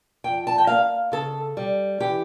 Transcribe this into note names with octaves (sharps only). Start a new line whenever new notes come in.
F2 G5
A5
G5
A#3 F5
C#3 A4
G3
E3 G4